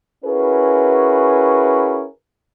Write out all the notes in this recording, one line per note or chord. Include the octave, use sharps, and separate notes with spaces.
C#4 E4 F#4 G#4 A#4 B4